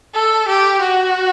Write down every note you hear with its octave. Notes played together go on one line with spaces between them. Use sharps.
A4
G4
F#4